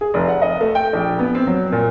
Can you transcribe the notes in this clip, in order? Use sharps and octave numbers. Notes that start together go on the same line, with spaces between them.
G#4
F1
F#5
D#5
A3
G5
A#1
B3
C4
F#3
A#2